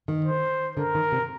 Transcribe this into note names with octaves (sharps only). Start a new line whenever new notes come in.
D#3
C5
D3 A#4
D#3
C3